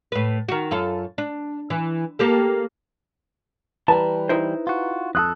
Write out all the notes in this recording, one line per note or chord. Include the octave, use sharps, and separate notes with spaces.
A2 B4
D#3 F#4
F#2 F4 A4
D4
E3
A#3 G4 A4
E3 G3 B4 A5 A#5
D#4 E4 C5
F4 F#4
F2 F4 A4 D#6 F#6